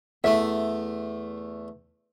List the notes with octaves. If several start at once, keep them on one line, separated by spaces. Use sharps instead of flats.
E2 A3 E5